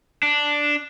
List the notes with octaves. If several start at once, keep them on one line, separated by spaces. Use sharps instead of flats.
D4